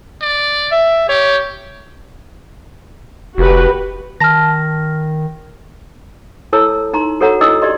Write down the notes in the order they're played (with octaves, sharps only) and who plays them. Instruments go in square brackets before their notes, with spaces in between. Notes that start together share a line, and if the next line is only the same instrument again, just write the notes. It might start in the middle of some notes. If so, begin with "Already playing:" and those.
[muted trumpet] D5
[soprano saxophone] E5
[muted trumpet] G4 [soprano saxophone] C#5
[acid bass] F1 [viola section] F#4 G4 B4
[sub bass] D#3 [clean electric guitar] A5 [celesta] F6 A#6
[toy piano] E4 A4 A#4 C#5 A5 E6
D#4 A#5 C6
F#4 A4 A#4 C#5 F#5 A#5
D4 E4 A#4 D#5 D#6 E6
G4 D5 D#5 C6